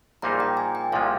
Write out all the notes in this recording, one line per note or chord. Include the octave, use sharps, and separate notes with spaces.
A#1 A#2 G3 A#3 D#4 A#5
G5
G#5
G5
C2 A#2 F3 G#3 F5